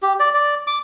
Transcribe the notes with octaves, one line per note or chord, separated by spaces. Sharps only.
G4
D5
D5
D6